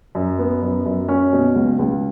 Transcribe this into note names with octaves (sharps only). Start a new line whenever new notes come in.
F#2
B3
F#2
F#2
C#4
B2
C#2
C#2